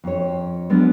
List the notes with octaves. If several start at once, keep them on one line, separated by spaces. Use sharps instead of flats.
F2 C#5
F#3 G#3 B3 C#4 D4